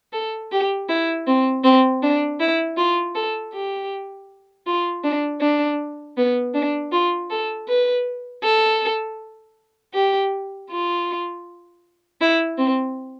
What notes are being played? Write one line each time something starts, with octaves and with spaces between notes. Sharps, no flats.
A4
G4
E4
C4
C4
D4
E4
F4
A4
G4
F4
D4
D4
B3
D4
F4
A4
B4
A4
G4
F4
E4
C4